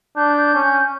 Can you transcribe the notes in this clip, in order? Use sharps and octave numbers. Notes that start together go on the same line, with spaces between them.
D4 G6
C#4